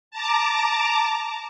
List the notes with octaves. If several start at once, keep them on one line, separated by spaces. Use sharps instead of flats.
A5 A#5 D6